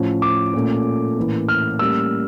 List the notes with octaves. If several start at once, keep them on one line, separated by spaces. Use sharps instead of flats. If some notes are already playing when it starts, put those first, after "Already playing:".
Already playing: A2 F3 C#4
D6
A#2 A3 C#4
A2 E3 A#3 C#4
F6
A2 G3 A#3 C#4 E6